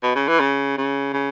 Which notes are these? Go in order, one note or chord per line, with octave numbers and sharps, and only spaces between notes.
B2
C#3
E3
C#3
C#3
C#3